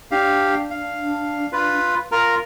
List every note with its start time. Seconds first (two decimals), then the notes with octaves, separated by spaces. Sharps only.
0.11 D4 G4 F5
0.71 F5
1.53 F4 B4
2.12 F4 A#4 A#5 F6